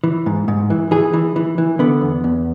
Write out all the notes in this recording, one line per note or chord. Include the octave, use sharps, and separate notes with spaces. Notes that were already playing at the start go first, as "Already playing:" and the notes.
E3
G#2
G#2
E3
E3 G#4
E3
E3
E3
D3 B3
E2
E2